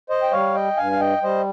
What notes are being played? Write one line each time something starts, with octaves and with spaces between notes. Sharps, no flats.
C5 D#5
G5
G3 C#5 F5
D#5 G5
G2 F5 G#5
F5
D#5 G5
G3 C5 D#5